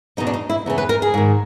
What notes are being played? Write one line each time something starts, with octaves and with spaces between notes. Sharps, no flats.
E2 B2 D#4
D4
D#4
E4
E2 C#3 E3
B4
A#4
G#4
G#2 D#3